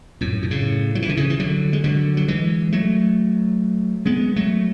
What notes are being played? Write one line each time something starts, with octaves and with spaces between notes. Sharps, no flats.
F#2 A2
B2
A2 C#3
F#3
E3
D3
C#3 E3
E3
D3 F#3
G#3
D3 F#3
F#3
E3 G#3
F#3 A3
G#3 B3
F#3 A3